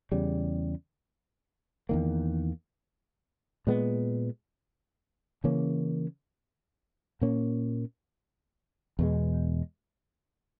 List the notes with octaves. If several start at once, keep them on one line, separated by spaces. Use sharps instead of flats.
E2 C#3 G3
E2 D#3 A#3
A#2 G#3 B3
C#3 E3 A#3 C#4
A#2 A#3 C#4
E2 B2 G#3